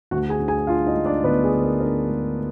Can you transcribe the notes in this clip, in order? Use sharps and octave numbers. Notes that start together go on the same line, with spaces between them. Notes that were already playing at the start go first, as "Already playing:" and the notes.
D2 F#4 F#5
G#4 G#5
D3
G#4 G#5
D4 F4 F5
D#4 D#5
G#3
D4 D5
D2 B3 B4
G#4
D3
A#4
D4 A#4
G#3